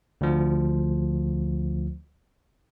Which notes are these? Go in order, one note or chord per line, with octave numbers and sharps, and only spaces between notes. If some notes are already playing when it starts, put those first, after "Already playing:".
D2 F3